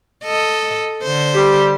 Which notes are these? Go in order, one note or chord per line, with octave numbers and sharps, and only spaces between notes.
A4 D#5
D3 C5
G3 G4